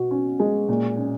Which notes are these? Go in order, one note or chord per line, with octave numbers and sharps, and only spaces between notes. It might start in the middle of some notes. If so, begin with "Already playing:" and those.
Already playing: B2 F#4
C#4
G#3
A#2
C#4